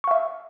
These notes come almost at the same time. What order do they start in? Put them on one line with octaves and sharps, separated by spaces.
C#6 F5 E5